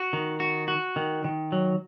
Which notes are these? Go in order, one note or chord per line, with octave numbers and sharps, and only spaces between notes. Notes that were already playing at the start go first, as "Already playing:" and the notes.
Already playing: F#4
D#3
F#4
F#4
D#3
D#3
F#3